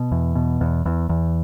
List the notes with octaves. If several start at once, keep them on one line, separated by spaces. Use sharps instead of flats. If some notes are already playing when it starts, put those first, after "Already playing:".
Already playing: B2
E2
B2
E2
E2
E2